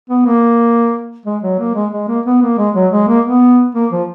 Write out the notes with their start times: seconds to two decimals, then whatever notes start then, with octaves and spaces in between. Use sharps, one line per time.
0.10 B3
0.26 A#3
1.26 G#3
1.43 F#3
1.59 A#3
1.75 G#3
1.93 G#3
2.08 A#3
2.26 B3
2.42 A#3
2.58 G#3
2.75 F#3
2.93 G#3
3.08 A#3
3.25 B3
3.75 A#3
3.92 F3